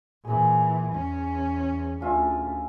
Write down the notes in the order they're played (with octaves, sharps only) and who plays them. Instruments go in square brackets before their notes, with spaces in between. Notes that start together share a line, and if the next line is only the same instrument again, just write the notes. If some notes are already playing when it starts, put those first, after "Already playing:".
[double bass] A#2 E3 [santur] G#4
[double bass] E2 C#4
[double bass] D2 [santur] C#4 F4 E5